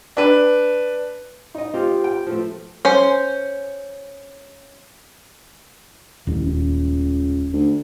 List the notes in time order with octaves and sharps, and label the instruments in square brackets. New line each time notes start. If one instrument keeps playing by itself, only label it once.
[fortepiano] D4 B4
D#4 D#5
[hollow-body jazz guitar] C4 F4 G4
[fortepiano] G5
F3 A3
[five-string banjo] C#4 C5
[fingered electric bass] D#1 [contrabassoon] A1
[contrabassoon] C#2
D2